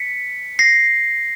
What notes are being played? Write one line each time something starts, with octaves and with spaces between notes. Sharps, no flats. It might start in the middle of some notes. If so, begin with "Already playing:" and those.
Already playing: B6 C#7
A#6 C7